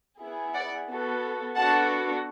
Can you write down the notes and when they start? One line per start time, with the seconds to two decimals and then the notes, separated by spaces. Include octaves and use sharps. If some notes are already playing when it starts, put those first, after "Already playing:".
0.20 B3 E4 G#4
0.54 D5 F#5
0.88 B3 F#4 A4
1.56 B3 D4 F#4 A4 F#5 A5